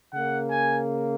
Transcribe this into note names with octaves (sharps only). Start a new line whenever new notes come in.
C#3 A#3 F#5
G#5